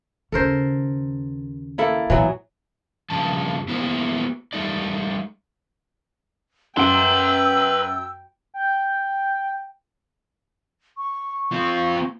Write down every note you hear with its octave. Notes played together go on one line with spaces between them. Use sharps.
D#2 C#3 A4 A#4 C5
A#3 E4 A4
A2 E3 F#3 B3
G2 C#3 F3 A5
A#3 B3 E4 F#4 C5
G3 A3 D#4 D5
F#2 B4 F#5 G5 C6 E6 D7
G5
C#6
C4 F4